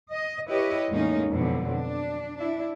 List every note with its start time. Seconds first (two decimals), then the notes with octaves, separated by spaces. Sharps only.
0.10 D#5
0.48 E4 G4 B4 C#5 D#5
0.89 E2 A2 G#3 A#3 C#4 D#4
1.29 F2 B2 D3 F#3
1.71 D4
2.39 D4 E4